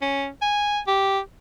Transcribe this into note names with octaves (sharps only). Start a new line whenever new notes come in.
C#4
G#5
G4